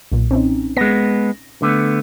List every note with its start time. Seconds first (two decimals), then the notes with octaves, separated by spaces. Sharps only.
0.12 B1 A#2
0.31 C4 C#4 D#4
0.77 G#3 B3 A#6
1.62 D3 A3 B3